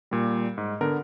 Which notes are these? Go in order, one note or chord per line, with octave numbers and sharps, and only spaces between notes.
A#2 G3
G#2
D3 B3 A#4